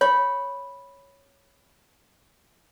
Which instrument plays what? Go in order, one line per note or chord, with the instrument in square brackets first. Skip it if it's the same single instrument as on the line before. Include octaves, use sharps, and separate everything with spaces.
[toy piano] C#5 [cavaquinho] B5 C#6